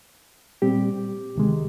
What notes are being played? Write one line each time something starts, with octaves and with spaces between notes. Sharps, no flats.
A#2 G3 C4 G4
D2 C3 D#3 G#3